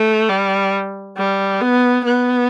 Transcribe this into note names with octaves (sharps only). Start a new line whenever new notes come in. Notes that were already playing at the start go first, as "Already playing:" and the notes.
Already playing: A3
G3
G3
B3
B3